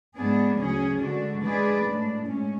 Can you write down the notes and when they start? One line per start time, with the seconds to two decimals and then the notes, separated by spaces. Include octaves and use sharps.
0.17 G#2 G#3 B3 D4 G#4
0.59 D2 C#3 F#3 C#4 G#4
1.00 D3 G#3 D4 F#4
1.43 G#3 D4 G#4 B4 D5
1.85 A2 G#3 D4
2.27 A2 G#3 C#4